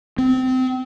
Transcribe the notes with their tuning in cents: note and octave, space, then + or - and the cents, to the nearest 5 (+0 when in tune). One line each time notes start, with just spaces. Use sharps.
C4 -25